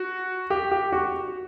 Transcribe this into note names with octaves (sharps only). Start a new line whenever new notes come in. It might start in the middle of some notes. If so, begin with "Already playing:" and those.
Already playing: F#4
G4
G4
F#4